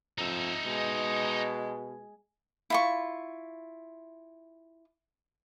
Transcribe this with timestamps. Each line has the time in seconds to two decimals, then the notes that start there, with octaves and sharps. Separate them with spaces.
0.18 F2 D#4 E5
0.66 B2 G#3
2.70 E4 F4 C#6